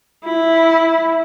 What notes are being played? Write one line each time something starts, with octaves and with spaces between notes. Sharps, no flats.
E4